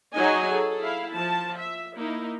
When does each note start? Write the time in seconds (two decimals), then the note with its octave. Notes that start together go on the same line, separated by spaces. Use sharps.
0.14 F#3 D#4 G#4 D#5 G#5
0.49 G#4 A4
0.81 E4 F5
1.12 F3 A5
1.57 E5
1.97 A#3 D#4 E4